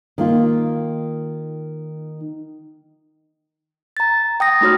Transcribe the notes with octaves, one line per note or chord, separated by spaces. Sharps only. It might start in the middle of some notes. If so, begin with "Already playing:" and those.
D#3 A#3 F4
A#5 A6
G5 D#6 A#6
A3 D#4 F#4 C#5 F6